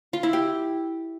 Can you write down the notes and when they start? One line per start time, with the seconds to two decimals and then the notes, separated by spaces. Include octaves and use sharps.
0.13 F4
0.23 E4
0.33 G4